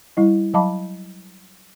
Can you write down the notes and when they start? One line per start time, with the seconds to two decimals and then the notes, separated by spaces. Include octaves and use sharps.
0.17 G3 E4 D#5
0.54 F#3 D#5 F5 A5 B5 D6